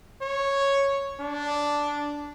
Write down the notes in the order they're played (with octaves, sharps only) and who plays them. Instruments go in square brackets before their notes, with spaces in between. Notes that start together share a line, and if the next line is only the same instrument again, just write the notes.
[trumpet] C#5
D4